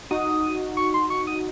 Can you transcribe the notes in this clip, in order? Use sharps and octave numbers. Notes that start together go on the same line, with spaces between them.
D#4 F#4 D#6
C#6
C6
C#6
D#6